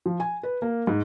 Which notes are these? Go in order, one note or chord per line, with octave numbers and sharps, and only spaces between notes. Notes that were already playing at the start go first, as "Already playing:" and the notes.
F3
G#5
B4
A#3
G#2